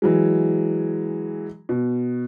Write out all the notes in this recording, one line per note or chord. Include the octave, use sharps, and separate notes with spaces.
E3 F#3 G#3
B2